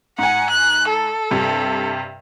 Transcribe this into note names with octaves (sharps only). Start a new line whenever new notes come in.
G#2 F#5 G#5
F#6
A4
G2 C3 G3